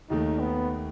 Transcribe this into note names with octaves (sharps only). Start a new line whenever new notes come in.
D#2 D#3 A3 D#4
B3